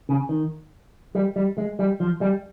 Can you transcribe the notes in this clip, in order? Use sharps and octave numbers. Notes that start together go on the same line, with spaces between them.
C#3
D#3
G3
G3
G#3
G3
F3
G3